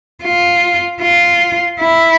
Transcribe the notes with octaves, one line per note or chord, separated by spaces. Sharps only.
F4
F4
E4